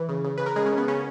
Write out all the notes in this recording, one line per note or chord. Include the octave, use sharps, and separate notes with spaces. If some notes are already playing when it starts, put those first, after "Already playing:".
Already playing: E3
C#3
C#3
C#3 B4
A#4
C#3 G#3 G#4
C#4
C#3
B3
C#3 C#4